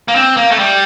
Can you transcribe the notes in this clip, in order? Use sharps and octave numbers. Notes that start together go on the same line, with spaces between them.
A#3
C4
A#3
A3
G3